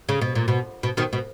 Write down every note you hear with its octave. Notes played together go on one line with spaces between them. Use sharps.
C#3
B2
A#2
B2
B2
B2 D#3
B2